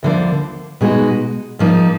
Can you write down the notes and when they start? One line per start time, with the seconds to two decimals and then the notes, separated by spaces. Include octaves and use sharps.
0.03 D2 D3 F3 A#3
0.81 B2 G#3 D#4 F#4
1.59 G#2 F3 A#3 D#4